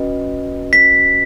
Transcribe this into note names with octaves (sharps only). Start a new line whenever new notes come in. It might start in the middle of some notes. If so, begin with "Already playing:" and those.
Already playing: C#4 F#4 B4 D#5
B6